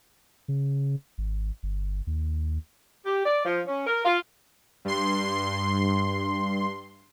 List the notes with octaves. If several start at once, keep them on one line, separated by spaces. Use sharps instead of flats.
C#3
G#1
G1
D#2
G4
D5
F3
C#4
A#4
F4
G2 C6